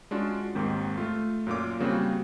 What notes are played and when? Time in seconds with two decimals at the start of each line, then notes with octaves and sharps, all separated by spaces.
0.11 G#3 C#4 D4 F4 F#4
0.55 D#2 G#2 D#3 C4
0.97 A3 F4
1.47 F#2 A#2 F4 D6
1.80 C#3 G3 A#3 C4 F#4